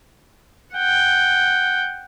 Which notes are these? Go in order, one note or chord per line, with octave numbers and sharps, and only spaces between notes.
F#5 G5